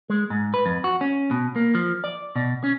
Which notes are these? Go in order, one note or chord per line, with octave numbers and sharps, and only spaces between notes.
G#3
G#2
B4
F2
F#4
C#4
B2
A#3
F3
D5
B2
C#4